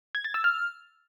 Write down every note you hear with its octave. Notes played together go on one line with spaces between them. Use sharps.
G#6
A6
E6
F6